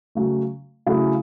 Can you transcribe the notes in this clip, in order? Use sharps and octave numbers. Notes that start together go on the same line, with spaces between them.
C#3 F#3 A3
C#3 F#3 A3 E4 G#4